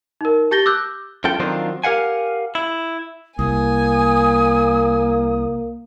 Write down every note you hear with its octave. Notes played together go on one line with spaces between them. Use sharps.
D#4 A#4
G4 A5 G6 A6 A#6 G7
D6 E6 F#6 G6
F#2 F4 A4 G5
D#3 F3 F#3 C4 D4 F4
G4 A#4 F5 F#5 G#5
E4
C2 A#3 G#5 D#6